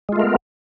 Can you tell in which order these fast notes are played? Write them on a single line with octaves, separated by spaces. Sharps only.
G#3 F4 A3 A#4 B3